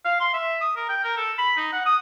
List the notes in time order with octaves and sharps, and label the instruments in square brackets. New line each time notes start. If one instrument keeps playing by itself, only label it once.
[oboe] F5
C6
E5
D#6
A#4
G5
A#4
A4
B5
D#4
F#5
D#6